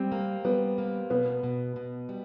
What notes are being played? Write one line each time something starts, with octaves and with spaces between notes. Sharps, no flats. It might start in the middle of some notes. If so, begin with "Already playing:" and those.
Already playing: G3 C4
A#3
G3 B3
A#3
B2 B3
B2
B2
G3